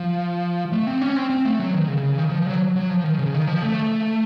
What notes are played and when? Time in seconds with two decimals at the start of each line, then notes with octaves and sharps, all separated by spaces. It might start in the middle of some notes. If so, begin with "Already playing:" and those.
Already playing: F3
0.72 A3
0.87 C4
1.01 C#4
1.16 C4
1.30 C4
1.45 A3
1.59 F#3
1.74 D#3
1.88 C#3
2.03 C#3
2.17 D#3
2.31 F3
2.46 F#3
2.76 F#3
2.89 F3
3.04 D#3
3.19 C#3
3.34 D#3
3.47 F3
3.63 A3